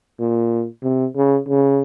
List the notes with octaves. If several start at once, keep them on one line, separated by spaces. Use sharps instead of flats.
A#2
C3
C#3
C#3